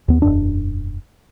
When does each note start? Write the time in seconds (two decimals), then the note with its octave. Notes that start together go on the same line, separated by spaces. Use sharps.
0.08 D#2 B3
0.22 E1 F#2 D4